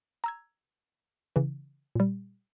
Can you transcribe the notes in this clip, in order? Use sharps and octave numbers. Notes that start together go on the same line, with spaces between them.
A#5 E6 G#6
C#3 E3
A#2 G3